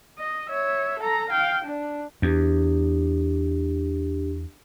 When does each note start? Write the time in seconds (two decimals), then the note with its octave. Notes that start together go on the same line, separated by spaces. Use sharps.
0.18 D#5
0.49 C#5 E5
0.99 A4 A#5
1.29 F5 G5
1.64 D4
2.22 E2 D4 G4